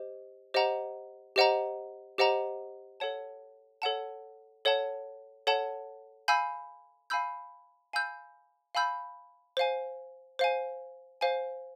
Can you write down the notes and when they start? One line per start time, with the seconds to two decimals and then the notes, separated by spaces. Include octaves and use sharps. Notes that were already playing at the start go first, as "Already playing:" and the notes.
Already playing: G4 C5 D#5
0.54 G4 C5 D#5 F#5 A#5
1.36 G4 C5 D#5 F#5 A#5
2.18 G4 C5 D#5 F#5 A#5
3.00 A4 C#5 F#5 A5
3.82 A4 C#5 F#5 A5
4.65 A4 C#5 F#5 A5
5.47 A4 C#5 F#5 A5
6.28 F5 G#5 B5 E6 G6
7.10 F5 G#5 B5 E6 G6
7.93 F5 G#5 B5 E6 G6
8.75 F5 G#5 B5 E6 G6
9.57 C5 F5 G#5
10.39 C5 F5 G#5
11.21 C5 F5 G#5